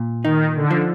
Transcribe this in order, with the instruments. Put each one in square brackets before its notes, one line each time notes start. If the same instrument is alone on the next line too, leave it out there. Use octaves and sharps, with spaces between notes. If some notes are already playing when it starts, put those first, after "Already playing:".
Already playing: [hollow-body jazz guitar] A#2
[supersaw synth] D#3 [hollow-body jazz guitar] D#4
[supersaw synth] D3
[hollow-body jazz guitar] F3